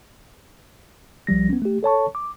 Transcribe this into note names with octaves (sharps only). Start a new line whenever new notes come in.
C2 F3 G3 A#6
B3 C#4
A3 G4
A4 C#5 A5 C#6
D6